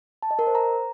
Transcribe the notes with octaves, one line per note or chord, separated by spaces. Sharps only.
A5
D#5
A#4
C5
A#5